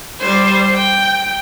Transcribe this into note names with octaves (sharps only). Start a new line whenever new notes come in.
G3 C5
G5